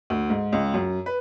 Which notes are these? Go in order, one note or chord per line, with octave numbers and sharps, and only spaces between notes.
D2
G#2
C#2
F#2
B4